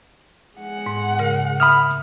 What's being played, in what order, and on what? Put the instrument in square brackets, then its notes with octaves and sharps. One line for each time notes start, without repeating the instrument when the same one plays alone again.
[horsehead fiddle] G#3 F#5
[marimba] G#2
C#3 A#4
[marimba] E5 [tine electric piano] B5 D#6 F6